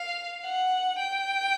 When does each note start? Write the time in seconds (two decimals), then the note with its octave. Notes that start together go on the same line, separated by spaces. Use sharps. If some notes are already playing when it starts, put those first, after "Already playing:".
Already playing: F5
0.46 F#5
0.99 G5